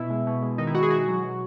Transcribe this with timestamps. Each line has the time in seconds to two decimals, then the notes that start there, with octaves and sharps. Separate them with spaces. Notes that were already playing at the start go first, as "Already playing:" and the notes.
Already playing: B2 E4
0.10 G#3
0.27 B2
0.42 G#3
0.58 D#3 D#4
0.67 E4
0.75 G#3 F#4
0.83 G#4
0.91 B2 F#4
1.08 F#3
1.23 B2